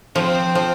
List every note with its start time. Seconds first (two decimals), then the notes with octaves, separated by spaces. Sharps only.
0.15 F3 C4
0.55 F3